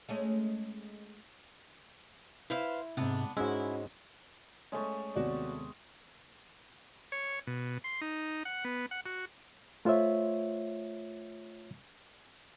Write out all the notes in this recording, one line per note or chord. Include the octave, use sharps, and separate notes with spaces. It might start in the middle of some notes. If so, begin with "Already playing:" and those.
G#3 A3 C#4
E4 B4 C5 F5
G#2 C3 B3 D4
G#2 G#3 C#4 E4 F#4
G#3 A3 C#4 C#5
D#2 C3 B3 F#4 D5
C#5
B2
C6
D#4
F#5
B3
F#5
F#4
A3 F4 C5 C#5 E5